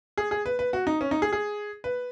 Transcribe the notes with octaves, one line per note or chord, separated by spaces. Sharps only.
G#4
G#4
B4
B4
F#4
D#4
C#4
D#4
G#4
G#4
B4